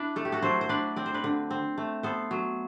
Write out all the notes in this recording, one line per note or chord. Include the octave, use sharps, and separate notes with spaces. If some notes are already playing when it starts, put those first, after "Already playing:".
Already playing: D4 E4 B4
A3 A4
G4
F#4 A4
F#3 A4 C5
C5
D4 B4 D5
C4 D5
C5
B4 D5
D3
C4
A3
B3 A4 C5
F#3